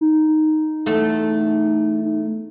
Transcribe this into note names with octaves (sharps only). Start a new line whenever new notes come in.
D#4
E2 A3 A4